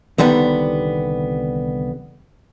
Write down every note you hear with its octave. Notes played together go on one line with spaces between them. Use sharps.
C2 D3 D#3 G3 B3